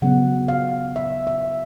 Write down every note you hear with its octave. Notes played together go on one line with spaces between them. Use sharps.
C#3 F#3 B3 F#5
F5
E5
E5